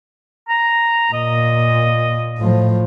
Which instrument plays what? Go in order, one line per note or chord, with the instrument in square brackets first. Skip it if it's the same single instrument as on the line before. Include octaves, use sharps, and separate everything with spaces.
[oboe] A#5
[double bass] A#2 [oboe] D#5
[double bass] A2 F3